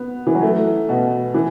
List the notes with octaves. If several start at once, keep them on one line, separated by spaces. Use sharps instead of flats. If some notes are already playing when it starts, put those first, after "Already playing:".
Already playing: B3
E3
F#3
A3
B2
E3